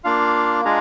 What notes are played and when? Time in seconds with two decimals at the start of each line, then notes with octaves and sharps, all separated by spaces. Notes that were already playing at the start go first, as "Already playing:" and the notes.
0.04 A#3 D4 F4 F5
0.65 G#3 D4 F4 G#4 A#5